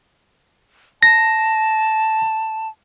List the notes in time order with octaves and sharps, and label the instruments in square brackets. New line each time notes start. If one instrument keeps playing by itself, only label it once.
[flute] A5 [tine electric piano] A#6